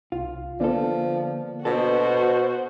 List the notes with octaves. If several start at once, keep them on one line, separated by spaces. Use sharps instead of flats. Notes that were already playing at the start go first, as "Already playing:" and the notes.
C2 F4
D3 F3 A#3 B3 A4 D5
B2 D4 F#4 A4 C5